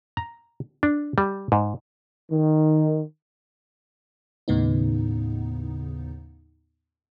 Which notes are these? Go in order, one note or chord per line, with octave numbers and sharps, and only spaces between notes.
A#5
D4
G3
G#2
D#3
D#2 A2 C#3 B3 D#4